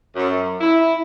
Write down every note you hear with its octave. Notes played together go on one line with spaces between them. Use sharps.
F#2
E4